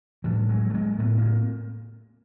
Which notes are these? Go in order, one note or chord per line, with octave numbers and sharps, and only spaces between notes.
A2 F3 G3
F#3 G#3
A3
G#3 A#3
A2 A3 B3
A#3 C4